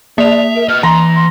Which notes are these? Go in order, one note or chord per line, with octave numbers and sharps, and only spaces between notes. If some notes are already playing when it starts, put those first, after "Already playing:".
A#3 D5 E5 F7
A#4
B4 D#5 F6
E3 A#5 C6
C6